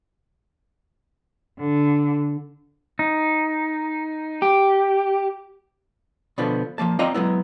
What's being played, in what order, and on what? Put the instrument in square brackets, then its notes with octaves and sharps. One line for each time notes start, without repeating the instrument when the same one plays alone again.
[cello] D3
[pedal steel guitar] D#4
[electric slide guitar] G4
[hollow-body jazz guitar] B2 D3 F3 B3
F3 A3 A#3 A5
C4 F4 D5 D#5 G5 A#5
F#3 G#3 B3 E4